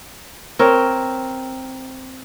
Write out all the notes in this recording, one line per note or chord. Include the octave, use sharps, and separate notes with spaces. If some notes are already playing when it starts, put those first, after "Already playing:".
C4 A#4 C#5